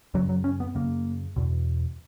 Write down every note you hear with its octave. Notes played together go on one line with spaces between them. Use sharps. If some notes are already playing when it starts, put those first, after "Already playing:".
F#2 C#3 F#3
F#3
C#4
B3
F#2 C#3 A#3
E2 B2